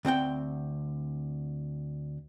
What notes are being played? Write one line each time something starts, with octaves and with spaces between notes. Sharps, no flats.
D2 C4 F#5 G5